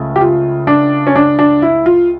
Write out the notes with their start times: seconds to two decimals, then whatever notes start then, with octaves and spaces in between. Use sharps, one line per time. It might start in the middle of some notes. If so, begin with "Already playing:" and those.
Already playing: C#2 C#3 A3
0.16 G4
0.21 F4
0.67 D4
1.07 C#4
1.15 D4
1.39 D4
1.62 E4
1.86 F4